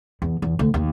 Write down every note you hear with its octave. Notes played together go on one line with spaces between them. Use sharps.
E2
E2
D2
D#2